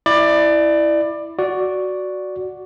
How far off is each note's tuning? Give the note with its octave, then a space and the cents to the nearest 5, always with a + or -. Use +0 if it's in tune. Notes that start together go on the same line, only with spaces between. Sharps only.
E4 +0 D5 +20
F#4 +0 D5 -5